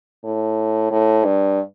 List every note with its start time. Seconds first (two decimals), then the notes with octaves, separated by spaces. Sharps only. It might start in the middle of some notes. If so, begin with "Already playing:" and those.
0.24 A2
0.91 A2
1.25 G2